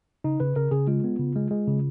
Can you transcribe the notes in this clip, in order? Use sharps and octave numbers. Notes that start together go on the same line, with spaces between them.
C#3 D#4
C#3 B4
C#3 A#4
C#3 G#4
G#3 F4
B3
C#3
G#3
G#3
C#3